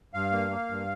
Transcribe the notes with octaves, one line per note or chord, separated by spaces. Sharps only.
G2 F5
A#3
A#3
G2